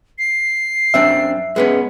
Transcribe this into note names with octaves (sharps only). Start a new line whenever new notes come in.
C7
F#2 C4 D4 E5
G#3 B3 C#4